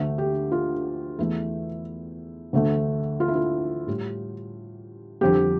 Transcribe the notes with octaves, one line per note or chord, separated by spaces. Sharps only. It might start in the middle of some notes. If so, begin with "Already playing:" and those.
Already playing: D2 D3 A3
G4
F4
E2 E3 A3 E4
D2 D3 A3
F4
E4
F4
A2 G3
F2 D3 G3 G4